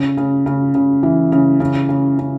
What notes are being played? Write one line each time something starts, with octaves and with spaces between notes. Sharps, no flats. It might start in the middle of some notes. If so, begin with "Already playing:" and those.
Already playing: C#3
C#3
C#3
C#3
E3
C#3
C#3
C#3
C#3